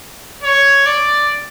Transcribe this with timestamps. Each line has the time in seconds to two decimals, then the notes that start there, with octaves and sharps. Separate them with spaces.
0.43 C#5
0.86 D5